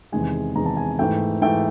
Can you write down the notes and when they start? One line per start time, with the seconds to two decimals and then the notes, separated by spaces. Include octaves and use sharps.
0.12 E2 C3 D#3 G#3 G#5
0.55 E2 C3 D#3 G#3 A#5
0.66 A5
0.77 G#5
0.99 G#2 E3 A3 G5
1.42 G#2 E3 A3 G5